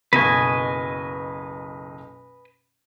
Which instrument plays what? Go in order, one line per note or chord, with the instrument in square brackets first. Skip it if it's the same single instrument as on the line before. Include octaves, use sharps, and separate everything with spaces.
[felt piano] F#1 B1 C#6 [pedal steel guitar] B4 D#5 G#5